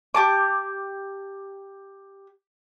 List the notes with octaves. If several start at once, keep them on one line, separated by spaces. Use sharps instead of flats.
G4 A5 D6